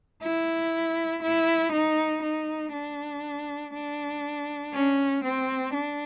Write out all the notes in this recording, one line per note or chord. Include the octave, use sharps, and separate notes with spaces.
E4
E4
D#4
D#4
D4
D4
C#4
C4
D4